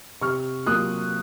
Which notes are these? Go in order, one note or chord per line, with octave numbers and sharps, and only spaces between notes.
C3 C#6 F6
F#3 A#3 F4 D#6 F#6